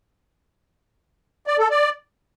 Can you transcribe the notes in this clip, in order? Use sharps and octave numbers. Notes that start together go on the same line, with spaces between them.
D5
A4
D5